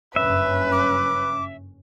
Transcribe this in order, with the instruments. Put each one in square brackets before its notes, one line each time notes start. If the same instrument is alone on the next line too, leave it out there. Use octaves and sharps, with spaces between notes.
[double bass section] F#1 G2 C#4 [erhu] B4 [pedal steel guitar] E5
[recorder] D6